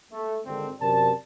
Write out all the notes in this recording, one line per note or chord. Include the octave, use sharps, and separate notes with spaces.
A3
G#1 D3 C4
F#2 C3 A#4 D5 A5